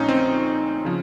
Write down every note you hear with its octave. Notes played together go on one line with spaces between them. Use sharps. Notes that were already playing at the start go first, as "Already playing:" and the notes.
Already playing: A#1 A#2 A3 C#4 D#4
C4
C#3 F3